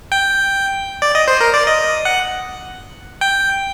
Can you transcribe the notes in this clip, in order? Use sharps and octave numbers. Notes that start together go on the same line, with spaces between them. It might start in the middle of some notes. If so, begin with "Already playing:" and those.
G5
D5
D#5
C5
A#4
D5
D#5
F#5
G5